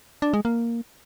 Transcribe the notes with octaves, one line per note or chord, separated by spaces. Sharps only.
D4
G#3
A#3